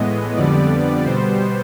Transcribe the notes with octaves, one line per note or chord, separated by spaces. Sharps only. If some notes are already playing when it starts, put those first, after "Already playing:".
Already playing: A2 E3 G#3 B3 D#5
F2 D3 G3 B3 D5
B2 G3 B3 C5